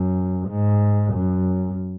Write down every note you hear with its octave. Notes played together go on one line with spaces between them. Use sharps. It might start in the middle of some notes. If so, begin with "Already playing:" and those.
Already playing: F#2
G#2
F#2